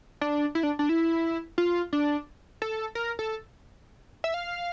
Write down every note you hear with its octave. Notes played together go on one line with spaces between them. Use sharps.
D4
E4
D4
D4
E4
F4
D4
A4
A#4
A4
E5
F5